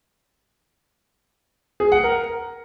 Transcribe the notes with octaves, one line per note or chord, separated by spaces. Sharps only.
G#4
F#5
A#4